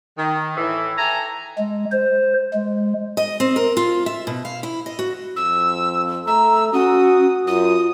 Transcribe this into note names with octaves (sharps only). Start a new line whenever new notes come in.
D#3
A2 E3
A4 E5 G5 G#5 A#5
G#3
C5
G#3
D#5
C4
A#4
F4
E5
B2
F5
E4
D#5
F#4
F2 E6
A3 A#5 E6
C#4 F#4 D#6
F#2 F4 D#6